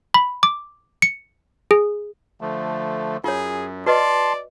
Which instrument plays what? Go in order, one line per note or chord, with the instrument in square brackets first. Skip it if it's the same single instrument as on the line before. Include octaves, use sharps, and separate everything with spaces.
[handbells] B5
D6
C#7
G#4
[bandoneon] D3 F3 A3
[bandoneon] F#2 [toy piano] F4 C#5 [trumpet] G#4
[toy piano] F#4 B4 D#5 [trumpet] D5 [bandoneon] A5 C6